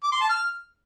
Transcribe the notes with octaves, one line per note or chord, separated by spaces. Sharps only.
D6
C6
A5
F6